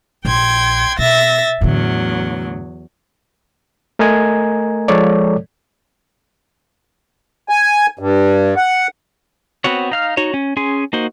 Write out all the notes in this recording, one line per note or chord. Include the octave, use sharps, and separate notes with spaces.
A#1 G5 C6 G#6
B2 E5 A6 A#6
E2 A2 D3 F#3
A3 A#4 D#5 G#5 A#5 G#6
F3 G#3 A4 C#5 D5
G#5
G2
F#5
B3 C4 F#4 C#5
D#4 F5 F6
D#4 F#4 C#5
C#4
C#4 G#4 C6
A#3 D#4 F#4 C5